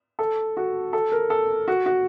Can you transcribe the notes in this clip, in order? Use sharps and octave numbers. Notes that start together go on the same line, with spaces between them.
A4
F#4
A4
A#4
A4
F#4
F#4